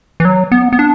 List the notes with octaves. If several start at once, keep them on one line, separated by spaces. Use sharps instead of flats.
E3
F#3
B3
B3
D4